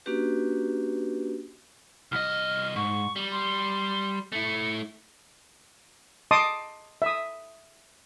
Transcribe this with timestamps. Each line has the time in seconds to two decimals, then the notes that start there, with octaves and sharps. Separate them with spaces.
0.06 A#3 C#4 D4 F#4 G4 B4
2.12 C2 D#5 F6
2.76 G#2 C#6
3.16 G3
3.32 C6
4.32 A3 E4 C#7
6.31 D#5 A5 C6 D6 D#6
7.02 E5 D#6